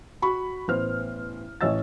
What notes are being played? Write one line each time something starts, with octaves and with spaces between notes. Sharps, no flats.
F#4 B5 C#6
A1 B3 C5 F6
A1 C#5 D#5 E6 A6